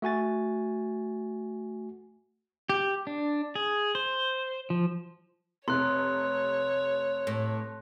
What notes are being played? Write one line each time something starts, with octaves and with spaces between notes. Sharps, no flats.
A3 F#4 G#5 A6
G4
D4
G#4
C5
F3
F1 C#5 C6 F#6
A2